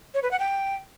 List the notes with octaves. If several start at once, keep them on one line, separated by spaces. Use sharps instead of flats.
C#5
B4
F#5
G5